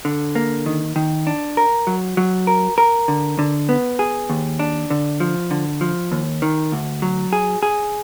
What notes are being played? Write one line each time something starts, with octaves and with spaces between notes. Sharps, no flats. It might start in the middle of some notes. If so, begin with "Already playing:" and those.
D3
A#3
D#3
D#3
D4
A#4
F#3
F#3
A#4
A#4
D3
D3
B3
G#4
D#2
D4
D3
F3
D3
F3
D#2
D#3
D2
F#3
G#4
G#4